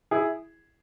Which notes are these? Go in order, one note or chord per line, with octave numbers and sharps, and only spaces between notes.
E4 G#4